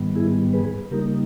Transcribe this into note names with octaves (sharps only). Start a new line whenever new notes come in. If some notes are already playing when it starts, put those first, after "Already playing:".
Already playing: G#2 D#3 G3 B3
E4 G#4
G#4 B4
C#3 G3 A#3 D#4 G4 A#4